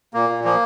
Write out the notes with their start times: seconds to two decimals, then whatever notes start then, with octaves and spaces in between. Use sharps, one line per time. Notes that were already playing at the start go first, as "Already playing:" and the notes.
0.14 A#2 A#3
0.29 A#2
0.44 F3 A#3